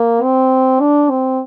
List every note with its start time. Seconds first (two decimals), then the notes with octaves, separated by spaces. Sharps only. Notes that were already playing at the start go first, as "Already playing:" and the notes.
Already playing: A#3
0.23 C4
0.80 D4
1.10 C4